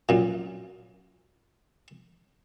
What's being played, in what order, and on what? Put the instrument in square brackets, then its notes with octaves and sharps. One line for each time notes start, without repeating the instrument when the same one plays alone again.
[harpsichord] F#2 A#2